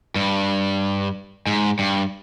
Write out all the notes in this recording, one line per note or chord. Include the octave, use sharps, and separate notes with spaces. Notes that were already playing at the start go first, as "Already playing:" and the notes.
G2
G#2
G2